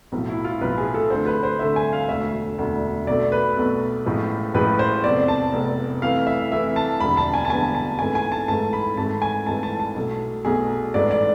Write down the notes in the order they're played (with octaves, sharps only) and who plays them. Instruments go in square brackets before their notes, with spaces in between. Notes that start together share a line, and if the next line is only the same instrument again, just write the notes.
[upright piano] B1 A2 F3
E4
F4
B1 A2 F3 B4
G#4
A4
D2 D3 A3 C5
B4
C5
D2 D3 A3 E5
G#5
F5
E1 D2 D3 A3 E5
E1 D2 D3 A3
B1 B2 A3 D5
B4
B1 B2 A3
A1 A2 F3 G#3
A1 A2 F3 G#3 B4
C5
F1 E2 C3 D5
A5
F1 E2 C3
F2 E3 A3 F5
E5
F2 E3 A3 E5
A5
E1 E2 D3 F3 B5
A5
G#5
A5
E1 E2 D3 F3 G#5
A5
G#1 G#2 E3 A3 G#5
G#5
A5
G#1 G#2 E3 A3 A5
B5
G#1 G#2 E3 A3 A5
G#5
G#1 G#2 E3 A3 A5
A5
A5
B1 B2 A3
B1 B2 A3 G#4
A1 G#2 E3 A3 D5
D5